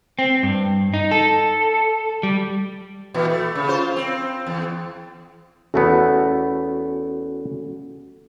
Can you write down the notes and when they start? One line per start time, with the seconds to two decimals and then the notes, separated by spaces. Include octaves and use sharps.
0.19 C4
0.43 G2
0.94 D#4
1.11 A4
2.23 G3
3.14 A#2 E3
3.30 A3
3.55 C#3
3.69 F4 C5
3.96 C4
4.46 E2
5.74 E2 A3 B3 C#4 F#4 A4